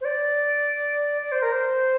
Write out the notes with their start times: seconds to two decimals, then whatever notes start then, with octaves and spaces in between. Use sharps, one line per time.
0.01 C5
0.05 D5
1.22 D5
1.32 C5
1.42 A#4
1.52 C5